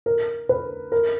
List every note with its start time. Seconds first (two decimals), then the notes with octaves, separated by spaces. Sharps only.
0.06 A#4
0.49 B4
0.92 A#4